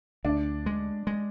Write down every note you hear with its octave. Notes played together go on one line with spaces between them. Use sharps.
D2 D4
G#3
G#3